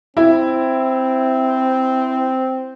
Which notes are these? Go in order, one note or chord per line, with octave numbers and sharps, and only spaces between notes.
C4 E4